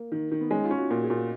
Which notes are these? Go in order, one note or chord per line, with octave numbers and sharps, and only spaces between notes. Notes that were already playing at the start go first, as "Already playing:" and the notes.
Already playing: A#3
D#3
D#3
B3
G#3 C#4
D#4
F4
C#4
F#4
A#2 F#4
G#4
A#2
F#4